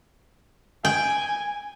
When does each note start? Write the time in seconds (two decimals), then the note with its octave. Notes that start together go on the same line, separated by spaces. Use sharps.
0.85 G5 G#5